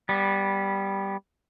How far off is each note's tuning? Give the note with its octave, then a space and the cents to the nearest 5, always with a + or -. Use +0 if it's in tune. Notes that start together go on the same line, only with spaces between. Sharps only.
G3 +0 B3 -20